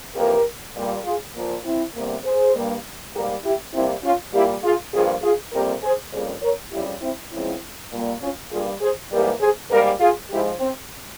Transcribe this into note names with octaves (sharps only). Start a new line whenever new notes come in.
F2 E3 A#3 G4 A#4
A#2 G3 A#3
F4 G#4
A#2 F3 A#3
C4 E4
E2 C3 G3 A#3
G#4 C5
G2 G3 A#3
G#2 G3 A#3 G4 A#4
E4 G4
C3 G3 A#3 C4 E4
C#4 F4
A#2 G3 A#3 E4 G4
F4 G#4
G2 F3 A#3 F4 G#4
F4 G#4
F2 C3 G3 A#3 G4 A#4
G#4 C5
F2 C#3 G3 A#3 G#4 C5
A#4 C#5
F2 C#3 G3 E4 G4
C4 E4
E2 C#3 F3 G#3 C4 E4
A#2 G3 A#3
C#4 F4
G2 G3 A#3 F4 G#4
G#4 C5
G#2 E3 G3 A#3 G4 A#4
G#4 C5
G#2 G3 A#3 G4 A#4
F4 G#4
G#2 F3 G#3 E4 G4
C4